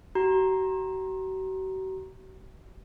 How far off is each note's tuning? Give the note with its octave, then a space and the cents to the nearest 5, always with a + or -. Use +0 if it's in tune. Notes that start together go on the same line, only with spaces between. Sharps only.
F#4 +45 A#5 +0